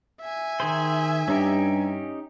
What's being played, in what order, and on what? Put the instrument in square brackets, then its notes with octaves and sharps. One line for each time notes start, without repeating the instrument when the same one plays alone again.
[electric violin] E5 G#5
[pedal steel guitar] D#3 G#4 C5
[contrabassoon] G2 [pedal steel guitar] C#4 D#4 G4